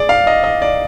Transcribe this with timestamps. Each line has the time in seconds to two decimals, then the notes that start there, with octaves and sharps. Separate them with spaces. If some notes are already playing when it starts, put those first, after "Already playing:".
Already playing: G#4 D5
0.09 F5
0.27 D#5
0.44 D#5
0.62 D5